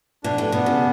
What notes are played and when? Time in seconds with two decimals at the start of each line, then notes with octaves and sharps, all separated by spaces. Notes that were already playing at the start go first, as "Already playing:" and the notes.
0.24 B2 D4
0.38 A2
0.52 B2 B3
0.66 C#3